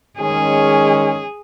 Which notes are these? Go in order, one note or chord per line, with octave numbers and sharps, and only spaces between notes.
D#3 G#3 C#4 G#4